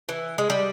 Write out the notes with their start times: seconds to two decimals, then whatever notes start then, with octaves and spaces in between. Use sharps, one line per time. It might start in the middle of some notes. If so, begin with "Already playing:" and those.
0.09 E3
0.38 G#3
0.50 G3